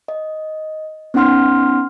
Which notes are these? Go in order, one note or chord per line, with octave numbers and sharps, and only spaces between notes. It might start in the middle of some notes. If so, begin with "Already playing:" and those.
D#5
B3 C#4 D#4 F#5 C6 F6